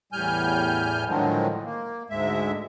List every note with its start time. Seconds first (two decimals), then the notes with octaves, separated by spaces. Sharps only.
0.12 E2 A2 G3 G#5 F6 G6
1.07 A2 D3 D#3 F3 F#3 G#3
1.65 A#3
2.10 D2 G#2 G#3 E5